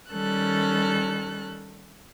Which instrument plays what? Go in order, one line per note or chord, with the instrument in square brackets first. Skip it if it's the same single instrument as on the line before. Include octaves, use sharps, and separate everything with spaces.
[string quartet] D#3 G3 C#4 A4 F#6